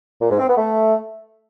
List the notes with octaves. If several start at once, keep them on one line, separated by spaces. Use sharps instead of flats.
A#2
G#2
C4
B3
A3